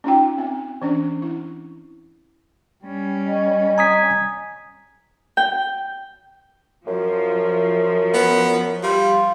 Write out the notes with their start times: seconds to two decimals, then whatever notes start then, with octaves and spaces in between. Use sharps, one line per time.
0.04 C#4 D#4 F4 G5
0.38 C4
0.82 E3 C#4 D4
1.22 E4
2.84 G3 C#4
3.26 D#5
3.78 G#5 A#5 D#6 B6
5.37 G5
6.87 F#2 F3
8.14 B3
8.83 G3 F4